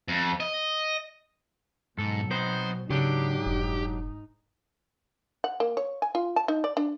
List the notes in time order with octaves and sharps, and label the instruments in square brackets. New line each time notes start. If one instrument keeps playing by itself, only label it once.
[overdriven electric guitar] F2
D#5
[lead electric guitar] G#2 [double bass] B2 F#3 [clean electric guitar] A4
[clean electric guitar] B3 C4 D#4 [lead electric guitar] C5
[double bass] G#2 D#4 [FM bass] C#3 [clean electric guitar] F#3 D4 [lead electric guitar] G4
[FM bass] F1
[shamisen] F#5
A#3
C#5
G#5
F4
A5
D#4
D5
D4